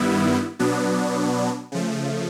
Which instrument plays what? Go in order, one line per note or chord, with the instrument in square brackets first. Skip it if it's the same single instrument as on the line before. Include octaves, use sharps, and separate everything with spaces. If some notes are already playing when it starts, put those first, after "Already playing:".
Already playing: [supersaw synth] G2 D#3 G3 B3 E4
B2 F#3 B3 D4
C#3 F3 A3